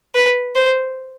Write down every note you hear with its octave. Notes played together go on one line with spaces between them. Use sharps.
B4
C5